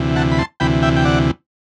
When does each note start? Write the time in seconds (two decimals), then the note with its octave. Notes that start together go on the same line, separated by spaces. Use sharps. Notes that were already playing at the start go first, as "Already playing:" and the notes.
Already playing: D2 C3 E3
0.16 F#5 A5
0.31 B5
0.39 A5 C6
0.60 D2 C3 E3 G5 B5
0.83 E5 G5
0.96 G5
1.05 D5 F#5